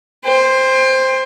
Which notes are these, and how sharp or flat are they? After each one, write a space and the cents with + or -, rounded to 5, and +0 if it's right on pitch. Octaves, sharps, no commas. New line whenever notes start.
C5 +0 G5 +30